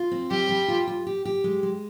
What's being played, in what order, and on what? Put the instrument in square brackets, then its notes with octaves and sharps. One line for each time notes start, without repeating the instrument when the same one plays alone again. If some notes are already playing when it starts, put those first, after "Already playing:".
Already playing: [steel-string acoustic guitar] F4
C4
[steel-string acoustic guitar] G3 [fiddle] G4
[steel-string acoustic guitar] G3
F4
F4
G4
G4
G#3
G#3